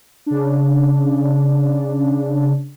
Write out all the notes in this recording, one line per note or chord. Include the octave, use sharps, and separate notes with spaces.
C#3 D4